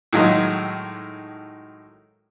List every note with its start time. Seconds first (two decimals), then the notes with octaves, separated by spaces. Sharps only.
0.13 A2 D#3 F#3 G#3